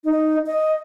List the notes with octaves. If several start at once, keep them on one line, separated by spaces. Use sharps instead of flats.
D#4
D#5